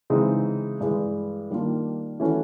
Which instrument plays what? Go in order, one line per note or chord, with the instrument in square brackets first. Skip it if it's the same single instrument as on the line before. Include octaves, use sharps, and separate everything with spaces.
[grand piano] C#3 E3 G#3 C4 D#4
G2 E3 G#3
D#3 G3 A#3 D4 F4
E3 A3 C#4 F#4